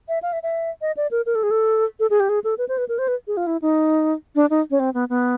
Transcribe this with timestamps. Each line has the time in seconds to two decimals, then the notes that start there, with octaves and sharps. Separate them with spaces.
0.09 E5
0.23 F5
0.33 E5
0.43 E5
0.81 D#5
0.97 D5
1.11 A#4
1.26 A#4
1.35 A4
1.43 G#4
1.51 A4
2.00 A4
2.10 G#4
2.20 G4
2.29 G#4
2.44 A4
2.58 B4
2.69 C5
2.78 B4
2.89 A#4
2.99 C5
3.08 B4
3.27 G#4
3.37 F4
3.47 E4
3.62 D#4
4.35 D4
4.50 D#4
4.71 C#4
4.80 C4
4.94 B3
5.10 B3